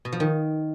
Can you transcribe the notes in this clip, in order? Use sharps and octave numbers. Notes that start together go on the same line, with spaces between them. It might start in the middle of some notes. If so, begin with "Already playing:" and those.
B2
F3
D#3